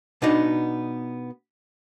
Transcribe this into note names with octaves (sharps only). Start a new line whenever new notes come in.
B2 B3 D4 D#4 B4